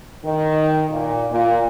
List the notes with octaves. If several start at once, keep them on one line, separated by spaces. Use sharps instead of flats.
D#3
A#2
A#2